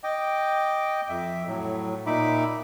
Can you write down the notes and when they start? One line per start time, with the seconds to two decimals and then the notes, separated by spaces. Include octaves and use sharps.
0.04 D#5 G5 D6
1.09 F2 E5
1.48 A2 F#3
2.06 A#2 D#4 E5 B5 D6